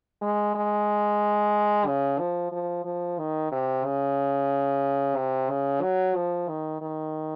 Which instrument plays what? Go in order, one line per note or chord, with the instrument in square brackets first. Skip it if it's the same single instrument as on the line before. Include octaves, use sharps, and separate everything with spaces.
[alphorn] G#3
G#3
C#3
F3
F3
F3
D#3
C3
C#3
C3
C#3
F#3
F3
D#3
D#3